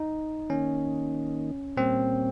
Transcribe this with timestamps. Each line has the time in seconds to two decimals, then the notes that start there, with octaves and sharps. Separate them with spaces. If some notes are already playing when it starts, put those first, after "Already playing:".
Already playing: D#4
0.50 D#3 A#3 C#4 D#4
1.77 A#2 G3 A#3 C4 C#4